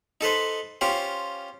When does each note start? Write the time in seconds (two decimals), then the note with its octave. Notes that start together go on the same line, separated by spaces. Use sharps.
0.21 D#4 A4 B4 C5
0.81 C#4 F4 G4 C5